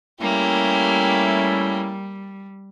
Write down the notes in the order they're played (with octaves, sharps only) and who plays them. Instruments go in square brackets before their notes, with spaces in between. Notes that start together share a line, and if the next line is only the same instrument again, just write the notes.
[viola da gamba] G3 [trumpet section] A3 C#4 E4 [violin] A#3 G4